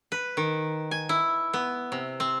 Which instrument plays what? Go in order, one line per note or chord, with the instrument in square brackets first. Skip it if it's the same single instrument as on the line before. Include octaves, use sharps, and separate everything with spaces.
[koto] B4
D#3
G#5
E4
B3
C3
C4